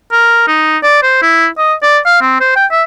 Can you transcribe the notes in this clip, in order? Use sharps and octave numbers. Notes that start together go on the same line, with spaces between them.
A#4
D#4
D5
C5
E4
D#5
D5
F5
C4
C5
G5
E5